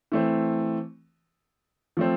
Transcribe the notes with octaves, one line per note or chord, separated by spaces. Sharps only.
E3 A3 C4
F3 A3 C4